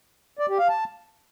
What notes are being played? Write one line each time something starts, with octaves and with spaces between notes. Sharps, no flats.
D5
G4
F5
A5